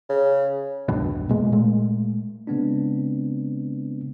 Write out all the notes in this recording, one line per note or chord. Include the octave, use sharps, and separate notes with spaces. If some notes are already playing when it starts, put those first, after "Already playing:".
C#3
B1 E2 G2 B2
B2 G#3 A#3
A#2 G#3 A3
C#3 G#3 B3 C4 D4